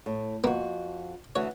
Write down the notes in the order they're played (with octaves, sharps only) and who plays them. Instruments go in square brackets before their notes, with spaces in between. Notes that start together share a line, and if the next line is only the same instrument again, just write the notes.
[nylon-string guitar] A2
[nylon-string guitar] F2 F#4 [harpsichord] A#3 B3
[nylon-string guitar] D2 E3 F#4 [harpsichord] C#5